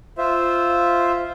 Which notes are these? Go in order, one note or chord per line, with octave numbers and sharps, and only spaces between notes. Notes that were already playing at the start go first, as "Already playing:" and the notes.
F4 C5 E5